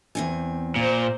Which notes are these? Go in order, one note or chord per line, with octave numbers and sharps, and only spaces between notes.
E2 C4 G#5
A#2 C5 A#5